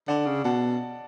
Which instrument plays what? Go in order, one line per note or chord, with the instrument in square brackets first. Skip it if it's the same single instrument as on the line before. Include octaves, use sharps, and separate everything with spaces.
[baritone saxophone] D3 [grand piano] D5 F#5
[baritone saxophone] C#3
[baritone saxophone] B2 [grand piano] F#5 A5